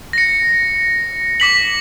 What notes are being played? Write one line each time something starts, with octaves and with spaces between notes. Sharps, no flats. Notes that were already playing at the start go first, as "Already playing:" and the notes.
A#6 C#7
D6 B6 F#7